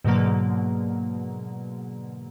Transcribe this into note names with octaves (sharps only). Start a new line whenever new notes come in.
G#2 B2 D3 F#3 A#3